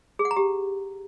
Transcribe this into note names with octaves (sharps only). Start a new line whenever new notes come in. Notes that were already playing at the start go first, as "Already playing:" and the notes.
G#4
F#5
A#5
G4